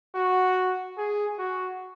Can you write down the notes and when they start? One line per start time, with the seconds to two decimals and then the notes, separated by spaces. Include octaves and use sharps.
0.16 F#4
0.98 G#4
1.38 F#4